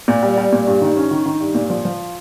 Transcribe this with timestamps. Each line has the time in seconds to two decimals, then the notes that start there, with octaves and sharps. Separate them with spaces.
0.08 A#2
0.23 G3
0.38 G3
0.53 A#2
0.67 G2
0.81 D#3
0.97 C#4
1.11 D#3
1.26 D#3
1.40 G2
1.55 A#2
1.70 F3
1.85 F3